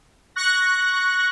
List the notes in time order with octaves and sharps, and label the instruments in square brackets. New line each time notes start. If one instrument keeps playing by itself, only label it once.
[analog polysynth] C#6 F#6 A#6